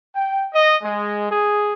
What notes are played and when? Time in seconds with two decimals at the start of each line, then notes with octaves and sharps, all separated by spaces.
0.15 G5
0.53 D#5
0.82 G#3
1.30 G#4